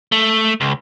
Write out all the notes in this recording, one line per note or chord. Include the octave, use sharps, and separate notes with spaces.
A3
C#2